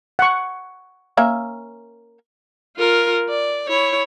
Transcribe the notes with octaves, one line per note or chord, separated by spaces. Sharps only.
F#5 C#6
A#3 C#4 E5
F4 A#4
D5
E4 C#5